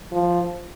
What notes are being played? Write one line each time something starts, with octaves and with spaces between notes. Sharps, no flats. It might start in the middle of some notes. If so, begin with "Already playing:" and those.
F3